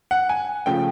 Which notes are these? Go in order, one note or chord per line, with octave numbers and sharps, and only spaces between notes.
F#5
G#5
C#3 F3 A3 G5